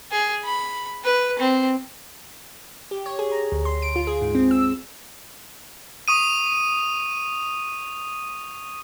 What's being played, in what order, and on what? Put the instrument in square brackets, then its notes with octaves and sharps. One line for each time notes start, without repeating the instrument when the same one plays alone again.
[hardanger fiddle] G#4
B5
B4
C4
[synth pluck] G4
C#5
G#4
A#5
D2
C6
D7
F4
G#4
G#2
C4
E6
[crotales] C#6 D#6 D#7